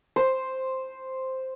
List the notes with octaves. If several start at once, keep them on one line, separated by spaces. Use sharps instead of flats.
C5